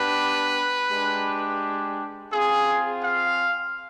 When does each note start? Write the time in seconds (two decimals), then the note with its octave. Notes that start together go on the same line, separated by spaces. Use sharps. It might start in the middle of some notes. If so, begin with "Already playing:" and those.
Already playing: B3 D4 G4 B4
0.90 G#3 D4 G4
2.32 C4 F4 G#4
3.04 F5